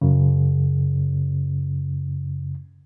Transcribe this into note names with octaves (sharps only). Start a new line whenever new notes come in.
F#2 C#3